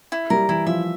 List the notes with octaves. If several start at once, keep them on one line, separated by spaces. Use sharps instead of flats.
E4
G3 A#4
E3 E4
F3 E5